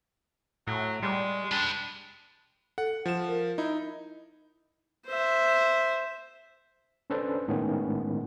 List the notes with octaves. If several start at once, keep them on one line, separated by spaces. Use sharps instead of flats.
A2 F#3
G3 G#3
D4 B4 G5
A4 F#5
F3 E7
A#4
D#4 E4
C5 E5
C#4 D4 A4 B4 C5 D5
A2 D#3 G#3 B3 C#4 E4